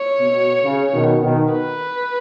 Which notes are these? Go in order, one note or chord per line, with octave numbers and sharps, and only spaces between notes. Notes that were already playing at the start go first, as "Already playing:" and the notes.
Already playing: C#5
B2
C#3
B2 D#3
B2 D#3
B4